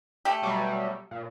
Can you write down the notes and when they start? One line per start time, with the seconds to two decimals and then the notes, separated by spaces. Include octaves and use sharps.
0.25 A3 G4
0.42 B2 F#3 G3
1.11 A#2